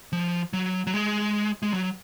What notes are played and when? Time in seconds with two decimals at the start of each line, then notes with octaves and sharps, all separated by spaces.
0.13 F3
0.53 F#3
0.87 F#3
0.94 G#3
1.63 G#3
1.74 F#3